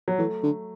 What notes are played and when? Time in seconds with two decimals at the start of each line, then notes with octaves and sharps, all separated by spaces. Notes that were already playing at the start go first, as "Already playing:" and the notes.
0.08 F#3
0.18 E3 A3
0.43 D3